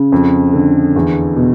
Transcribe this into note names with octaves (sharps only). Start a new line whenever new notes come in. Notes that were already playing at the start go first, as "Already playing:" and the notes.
Already playing: C#3
F2
D3
E2
B2